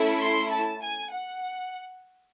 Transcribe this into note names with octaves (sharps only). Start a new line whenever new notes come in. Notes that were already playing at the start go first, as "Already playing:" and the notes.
Already playing: A3 C#4 E4 A4
C6
A5
G#5
F#5